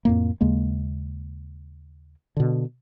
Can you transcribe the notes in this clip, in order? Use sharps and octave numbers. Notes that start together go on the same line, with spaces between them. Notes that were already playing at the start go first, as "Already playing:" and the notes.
F2 A2 A#3
D#2 C#3 G#3 A#3
B2 D3